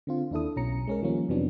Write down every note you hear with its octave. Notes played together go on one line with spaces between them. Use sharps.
D3 C4 F4
D#2 D4 E4 A4 D#6
B1 B2 C#4 A#5 C#7
G#3 C#4 A#4
D#3 F3 G3 A#3 C#4
F2 C3 E3 F#3 B3 D4